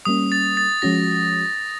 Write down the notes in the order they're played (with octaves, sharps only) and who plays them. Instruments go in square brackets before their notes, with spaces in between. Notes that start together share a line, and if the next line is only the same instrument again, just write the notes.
[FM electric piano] G3 A#3 C#4 [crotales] D#6
[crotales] A6
A6
[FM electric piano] F3 G#3 C#4 F#4 [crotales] A#6